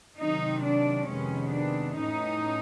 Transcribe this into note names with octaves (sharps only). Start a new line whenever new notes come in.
C3 D#3 F#3 D#4
D4
F2 C3 D#3 G#3 B3 C#4
D4
A2 E3 A3 C#4 D#4